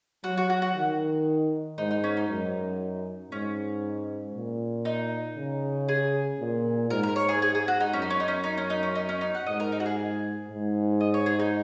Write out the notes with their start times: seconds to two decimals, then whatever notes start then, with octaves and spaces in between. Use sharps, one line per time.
0.24 F#3 F#4
0.38 F#4
0.50 F#4
0.62 F#4
0.75 D#3
1.78 G#2 D#4
1.91 D#4
2.04 C#4
2.17 D#4
2.29 F#2
3.32 G#2 C#4
4.35 A#2
4.85 D#4
5.37 C#3
5.89 G#4
6.40 A#2
6.90 G#2 A#4
7.03 A#4
7.16 C#5
7.29 G#4
7.42 G#4
7.55 G#4
7.68 F#4
7.80 D#4
7.93 F#2 C#4
8.02 D#4
8.10 C#4
8.20 D#4
8.28 C#4
8.44 D#4
8.58 C#4
8.70 D#4
8.83 C#4
8.95 D#4
9.09 C#4
9.21 D#4
9.35 F#5
9.46 G#2 D#5
9.60 A#4
9.72 D#4
9.80 F#4
9.86 G#4
10.50 G#2
11.00 D#5
11.14 C#5
11.26 G#4
11.39 D#4